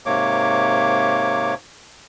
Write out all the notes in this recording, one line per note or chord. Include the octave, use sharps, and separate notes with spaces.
G#2 C3 A#3 C#5 D6